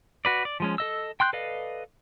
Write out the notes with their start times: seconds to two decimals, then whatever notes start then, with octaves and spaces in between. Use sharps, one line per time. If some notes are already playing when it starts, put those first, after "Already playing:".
0.25 F#4 B4 D5
0.45 D5
0.60 F3 G#3 C#4
0.78 A4 D#5 E6
1.20 G5 C6 F#6 G6
1.33 A4 B4 D5 D#5 F5